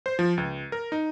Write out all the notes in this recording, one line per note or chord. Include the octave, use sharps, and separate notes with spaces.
C5
F3
C#2
A#4
D#4